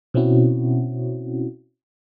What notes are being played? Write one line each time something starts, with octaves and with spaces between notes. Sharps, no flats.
B2 C4 C#4 E4 F#4